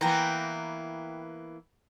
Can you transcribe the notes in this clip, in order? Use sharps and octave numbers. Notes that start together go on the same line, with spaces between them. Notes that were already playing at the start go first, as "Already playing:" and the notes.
E3 A#3 B3 G5 A#5